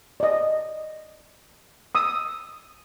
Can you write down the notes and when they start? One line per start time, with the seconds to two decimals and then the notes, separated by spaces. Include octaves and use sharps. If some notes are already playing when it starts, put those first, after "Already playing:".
0.20 D5 D#5
1.95 D#6 E6